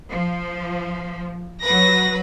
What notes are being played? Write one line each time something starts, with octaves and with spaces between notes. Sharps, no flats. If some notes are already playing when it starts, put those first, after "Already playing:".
F3
F#3 B4 A#6